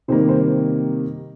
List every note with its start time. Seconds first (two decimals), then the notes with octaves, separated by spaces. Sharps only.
0.08 C3 D#3 G3 A#3 C5
0.29 C5